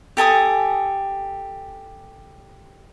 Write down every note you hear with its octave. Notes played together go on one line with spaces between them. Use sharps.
G4 A4 G#5 D#6